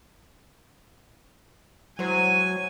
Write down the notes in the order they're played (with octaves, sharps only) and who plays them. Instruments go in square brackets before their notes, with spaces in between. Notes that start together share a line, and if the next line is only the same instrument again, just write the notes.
[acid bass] F#3 [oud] G#3 E4 C5 [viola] G#5